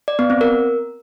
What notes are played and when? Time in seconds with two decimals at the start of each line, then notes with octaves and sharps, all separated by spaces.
0.08 D5
0.19 B3
0.30 C4
0.41 A#4